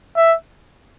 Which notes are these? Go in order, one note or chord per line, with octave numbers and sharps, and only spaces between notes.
E5